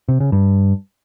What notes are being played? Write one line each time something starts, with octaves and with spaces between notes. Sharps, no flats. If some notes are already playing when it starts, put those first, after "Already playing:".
C3
C#3
G2